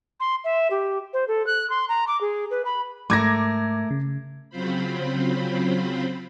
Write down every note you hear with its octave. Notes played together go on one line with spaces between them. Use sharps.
C6
E5
G4
C5
A4
F#6
C6
A#5
D6
G#4
B4
B5
G#2 A3 A#4 D6 G#6 A#6
C#3
C#3 F#3 C4 F4 C5 B5